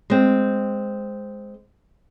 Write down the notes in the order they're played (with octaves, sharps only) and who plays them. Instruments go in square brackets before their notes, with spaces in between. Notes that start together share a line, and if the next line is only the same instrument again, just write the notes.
[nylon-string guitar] G#3 C4